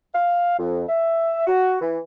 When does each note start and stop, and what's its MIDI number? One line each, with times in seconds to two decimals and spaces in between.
0.14 0.58 77
0.59 0.82 41
0.88 1.47 76
1.47 1.80 66
1.81 1.99 52